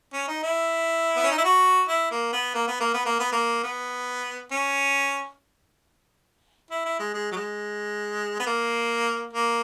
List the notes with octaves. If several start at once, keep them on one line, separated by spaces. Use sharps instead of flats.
C#4
D#4
E4
B3
C#4
D#4
E4
F#4
E4
A#3
B3
A#3
B3
A#3
B3
A#3
B3
A#3
B3
C#4
E4
E4
G#3
G#3
F#3
G#3
B3
A#3
A#3